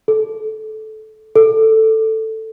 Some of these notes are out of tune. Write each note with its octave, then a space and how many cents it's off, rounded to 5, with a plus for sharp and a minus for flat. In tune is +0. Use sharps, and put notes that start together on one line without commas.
A4 -15
A4 +5